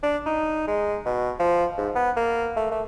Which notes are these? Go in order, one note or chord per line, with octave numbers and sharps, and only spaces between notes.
D4
D#4
G#3
B2
F3
G#2
B3
A#3
A3
A3